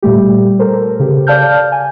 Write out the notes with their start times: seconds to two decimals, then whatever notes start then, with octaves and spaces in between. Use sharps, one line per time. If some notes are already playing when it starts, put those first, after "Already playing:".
0.03 A#2 G3 A3 G4
0.59 A4 A#4 C5
1.00 C#3 G4
1.27 D5 F5 A5 F6 G6
1.72 G#5